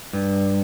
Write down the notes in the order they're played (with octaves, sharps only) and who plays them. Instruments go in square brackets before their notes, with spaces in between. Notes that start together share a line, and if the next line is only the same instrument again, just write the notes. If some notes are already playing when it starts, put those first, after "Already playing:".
[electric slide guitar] G2